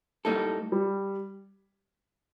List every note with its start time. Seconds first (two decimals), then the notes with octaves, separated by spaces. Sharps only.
0.25 A2 G3 A#3 D#4 A4
0.72 G3